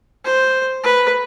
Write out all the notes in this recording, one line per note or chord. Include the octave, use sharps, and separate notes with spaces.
C5
B4